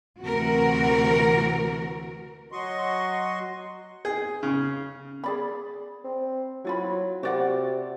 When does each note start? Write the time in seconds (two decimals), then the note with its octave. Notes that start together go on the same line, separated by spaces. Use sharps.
0.22 D2 C3 E3 F#4 A#4
2.52 F#3 F#4 D#5 C6 C#6
4.05 G#4
4.43 C#3
5.24 G#4 D5 B5
6.04 C4
6.65 F#3 E4 F4 B5
7.23 C3 F#4 D5 F#5